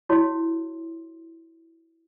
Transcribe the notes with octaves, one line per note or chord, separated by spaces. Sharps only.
E4 F#4 C#5 C6